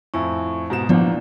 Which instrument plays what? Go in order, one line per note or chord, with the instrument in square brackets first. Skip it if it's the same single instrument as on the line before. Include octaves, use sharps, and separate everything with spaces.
[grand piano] F2 A2 [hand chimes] E5 G#5 C#6
[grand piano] G#2 B2 E7
[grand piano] A1 A#2 F#5 [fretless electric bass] F3 B3 [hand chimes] D4 E4 D5